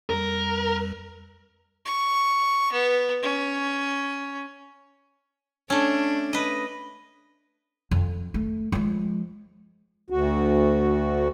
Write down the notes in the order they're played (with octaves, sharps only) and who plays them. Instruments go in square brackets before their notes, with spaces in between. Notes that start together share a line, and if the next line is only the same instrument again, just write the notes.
[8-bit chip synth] F2 G3 [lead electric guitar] A#4
[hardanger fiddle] C#6
B3
C#4
[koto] A3 C#4 [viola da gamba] D4
[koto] B4 D#5
[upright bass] F2
A3
F3 G#3
[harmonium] D2 F#4